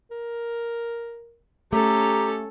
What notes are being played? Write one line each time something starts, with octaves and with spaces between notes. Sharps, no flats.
A#4
A3 C#4 G4 A4 A#5